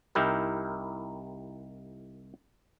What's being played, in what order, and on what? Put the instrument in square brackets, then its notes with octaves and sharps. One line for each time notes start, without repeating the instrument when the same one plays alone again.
[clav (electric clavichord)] C2 D#4 E4 G4 A#4